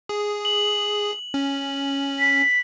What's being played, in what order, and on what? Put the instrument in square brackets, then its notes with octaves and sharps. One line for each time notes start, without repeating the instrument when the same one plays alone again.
[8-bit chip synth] G#4
[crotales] F#7
[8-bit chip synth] C#4
[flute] B6